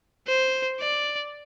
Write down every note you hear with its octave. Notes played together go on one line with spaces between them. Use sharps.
C5
D5